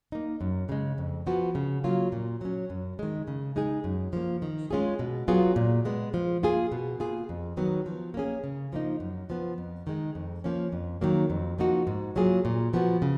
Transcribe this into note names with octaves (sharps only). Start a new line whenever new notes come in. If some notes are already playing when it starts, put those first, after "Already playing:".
A#3 D#4
F#2
C#3 G#3
F2
F3 B3 F#4
C#3
F#3 A#3 F4
A#2
F#3 C#4
F#2
D#3 G#3
C#3
G#3 D#4 G#4
F#2
F3 A#3
D#3
G#3 C#4 F4 G#4
B2
F#3 B3 F4 G#4
A#2
G#3 B3
F3
A#3 F4 G#4
B2
A#3 F4 G#4
F2
D#3 F#3 B3
F3
A#3 C#4 G#4
C#3
F3 A#3 D#4
F#2
F3 B3
F2
D#3 G#3
F2
F3 A#3 C#4
F2
D#3 F#3 A#3
F2
F3 A#3 D#4 F#4
G#2
F#3 A#3 F4 G#4
A#2
F3 B3 F#4
C#3